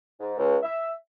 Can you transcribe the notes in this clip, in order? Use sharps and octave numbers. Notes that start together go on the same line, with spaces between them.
G#2
C#2
E5